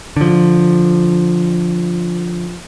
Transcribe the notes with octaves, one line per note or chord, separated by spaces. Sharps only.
D3 F3